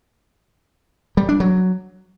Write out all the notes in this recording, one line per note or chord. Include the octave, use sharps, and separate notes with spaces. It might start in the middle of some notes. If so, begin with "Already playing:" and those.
G3
D4
F#3